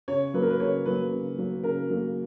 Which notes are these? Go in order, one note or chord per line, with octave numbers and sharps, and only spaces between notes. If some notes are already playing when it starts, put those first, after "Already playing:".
C#3 C#5
F#3 A#3 B4
A#4
B4
C#3 C#5
F#3 A#3 B4
C#3
F#3 A#3
C#3 A#4
F#3 A#3